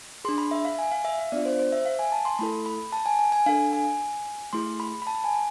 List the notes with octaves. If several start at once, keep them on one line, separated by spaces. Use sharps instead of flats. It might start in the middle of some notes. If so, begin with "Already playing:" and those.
D4 G#4 C6
B5
E5
F5
G#5
F5
E5
F5
B3 D4 F4 D5
C5
C5
E5
F5
G#5
A5
C6
A3 E4 A4 B5
B5
A5
G#5
G#5
G#5
D4 A4 F5
G#5
A3 E4 G#4 C6
B5
B5
A5
G#5